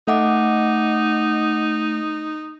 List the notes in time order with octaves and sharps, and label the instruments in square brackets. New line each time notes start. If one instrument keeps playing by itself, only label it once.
[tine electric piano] A3 [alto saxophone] D#4 [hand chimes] D#5 F#5 D6